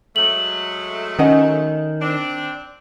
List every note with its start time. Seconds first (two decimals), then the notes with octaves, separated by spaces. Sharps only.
0.16 F#3 G#3 A3 F#7
1.19 D#3 C#4 D#5 F#5
2.01 C4 D4